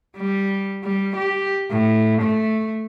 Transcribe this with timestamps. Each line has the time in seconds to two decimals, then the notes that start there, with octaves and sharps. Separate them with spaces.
0.17 G3
0.84 G3
1.16 G4
1.71 A2
2.21 A3